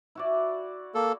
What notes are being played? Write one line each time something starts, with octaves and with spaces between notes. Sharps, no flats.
E4 F#4 D5
A#3 A4